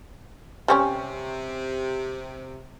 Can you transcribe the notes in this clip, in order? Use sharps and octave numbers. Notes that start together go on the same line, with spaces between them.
C3 G3 C4 C#4 G#5 C#6 F6